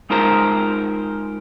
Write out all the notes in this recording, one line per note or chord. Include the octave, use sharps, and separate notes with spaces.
G#3 D#4 F4 A#4 C5 A#5